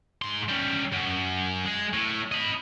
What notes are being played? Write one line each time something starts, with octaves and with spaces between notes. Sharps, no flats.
G#2 C6
G3 C#4
F#2
G#3 G#4
A2
D#5 B5